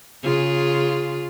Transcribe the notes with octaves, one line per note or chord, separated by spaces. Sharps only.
C#3 F4 G#4